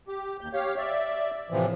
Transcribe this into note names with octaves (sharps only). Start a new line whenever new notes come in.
G4
D#2 G6
G4 C#5 F5
D5 E5
A2 C3 E3 F3